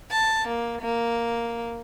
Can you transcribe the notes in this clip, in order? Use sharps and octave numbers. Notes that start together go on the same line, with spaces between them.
A5
A#3
A#3